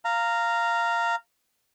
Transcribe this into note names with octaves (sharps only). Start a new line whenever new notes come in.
F5 A#5